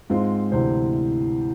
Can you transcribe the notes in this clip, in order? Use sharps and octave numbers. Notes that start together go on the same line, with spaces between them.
G#2 G#3 C4 F4
D2 C3 E3 C5